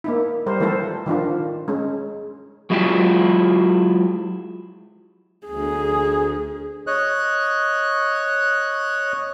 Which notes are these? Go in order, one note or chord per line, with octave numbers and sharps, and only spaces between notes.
A#3 D#4 E4
G3 A#4 C5
E3 F3 A3 E4 A4 C5
D#3 F3 D4 F4
G#3 C#4
F#3 G#3 E4 F4 G4
D2 G#4
C#5 D#5 F#6